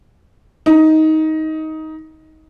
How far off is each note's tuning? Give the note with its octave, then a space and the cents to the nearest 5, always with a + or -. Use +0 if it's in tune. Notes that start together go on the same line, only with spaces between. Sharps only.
D#4 +15